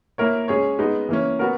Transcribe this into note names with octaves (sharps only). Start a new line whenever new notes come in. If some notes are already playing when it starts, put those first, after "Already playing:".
A#3 E4 A#4 C#5
G#3 C#4 G#4 C#5
G#3 B3 D#4
E3 A#3 C#4
B3 F#4 A#4